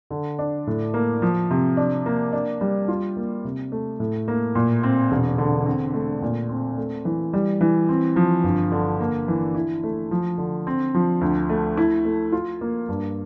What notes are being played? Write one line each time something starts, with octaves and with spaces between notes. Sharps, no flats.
D3
D4
A2
A#3
F3
C3
D4
A#3
D4
G3
F4
A#3
C3
A3
A2
A#3
A#2
C4
E1
D3
C4
A3
A#2
C4
A3
E3
G3
E3
C4
F3
G1
D3
A#3
E3
E4
A3
F3
D3
C4
F3
D2
A3
E4
A3
F4
A#3
G2